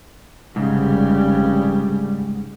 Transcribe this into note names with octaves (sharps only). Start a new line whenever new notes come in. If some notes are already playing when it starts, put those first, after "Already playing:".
F1 G#2 C#3 G3